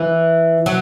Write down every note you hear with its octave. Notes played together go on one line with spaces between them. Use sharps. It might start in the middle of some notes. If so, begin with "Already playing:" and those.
Already playing: E3
F#3